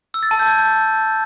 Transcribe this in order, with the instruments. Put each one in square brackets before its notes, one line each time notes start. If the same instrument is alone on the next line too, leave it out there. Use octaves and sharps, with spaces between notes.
[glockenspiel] E6
A6
A5
G6
G#6